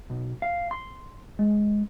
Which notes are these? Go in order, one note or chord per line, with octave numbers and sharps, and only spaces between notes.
B1
F5
C6
G#3